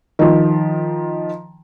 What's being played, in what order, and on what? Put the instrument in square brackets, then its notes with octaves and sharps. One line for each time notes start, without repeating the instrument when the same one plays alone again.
[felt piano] D#3 F3